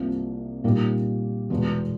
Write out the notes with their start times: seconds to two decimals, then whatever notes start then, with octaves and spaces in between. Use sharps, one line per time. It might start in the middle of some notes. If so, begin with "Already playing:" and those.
Already playing: C2 C3 F3 A#3
0.64 A#2 G3 A#3 D#4 G4
1.50 E2 B2 G#3 B3